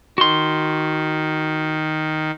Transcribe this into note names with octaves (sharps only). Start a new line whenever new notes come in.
D#3 F#4 C6